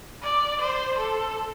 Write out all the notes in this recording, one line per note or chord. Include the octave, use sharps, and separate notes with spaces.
D5
C5
A4